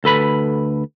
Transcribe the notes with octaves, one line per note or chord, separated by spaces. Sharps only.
D2 A4 B4 B5